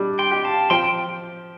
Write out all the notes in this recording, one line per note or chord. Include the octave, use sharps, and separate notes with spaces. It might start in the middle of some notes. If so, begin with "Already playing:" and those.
Already playing: G3 D4
G5 C6
G4
F5 A5
F3 G5 C6